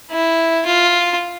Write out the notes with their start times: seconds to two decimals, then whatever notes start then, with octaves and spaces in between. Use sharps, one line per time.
0.11 E4
0.66 F4